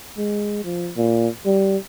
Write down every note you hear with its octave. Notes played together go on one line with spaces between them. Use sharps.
G#3
F3
A#2
G3